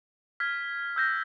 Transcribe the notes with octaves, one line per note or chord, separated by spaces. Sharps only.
F6 G#6 B6
E6 G6 A#6